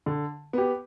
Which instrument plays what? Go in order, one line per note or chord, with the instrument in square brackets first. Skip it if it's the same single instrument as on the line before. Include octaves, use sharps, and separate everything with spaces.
[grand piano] D3
B3 G4